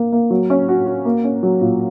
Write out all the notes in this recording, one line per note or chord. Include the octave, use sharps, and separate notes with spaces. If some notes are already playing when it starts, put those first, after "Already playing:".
Already playing: A#3
A#3
F#3
C#4
F#4
F#4
A#3
C#4
F#3
A#2